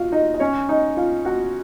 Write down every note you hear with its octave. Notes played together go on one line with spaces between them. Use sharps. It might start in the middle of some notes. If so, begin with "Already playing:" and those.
Already playing: F4 F#4 F5
D#4 D#5
D#5
C#4 C#5
D#4 D#5
F4 F5
F#4 F#5